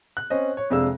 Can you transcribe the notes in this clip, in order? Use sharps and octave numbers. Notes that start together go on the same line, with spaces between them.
F#6
C4 C#4 C5 D#5
C#5
F2 C3 G#3 D4 F5 E6